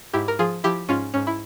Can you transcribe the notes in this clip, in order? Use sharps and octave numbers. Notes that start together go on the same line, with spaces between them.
G#2 E4 G4
A#4
F3 F4 G#4
F3 E4 G4
G#2 C#4 F4
G#2 C#4
E4